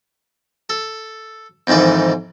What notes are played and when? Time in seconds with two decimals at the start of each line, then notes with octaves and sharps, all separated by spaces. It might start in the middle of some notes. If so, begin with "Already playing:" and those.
0.70 A4
1.67 F2 G#2 D#3 E3 D5